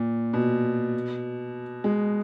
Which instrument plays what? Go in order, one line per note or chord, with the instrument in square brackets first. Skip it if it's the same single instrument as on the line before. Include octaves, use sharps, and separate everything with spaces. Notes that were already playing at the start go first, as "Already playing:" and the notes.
Already playing: [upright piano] A#2
B2
G#3